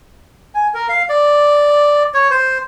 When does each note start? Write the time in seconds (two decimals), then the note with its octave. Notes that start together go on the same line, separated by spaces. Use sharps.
0.55 G#5
0.74 A#4
0.89 F5
1.09 D5
2.14 C#5
2.31 C5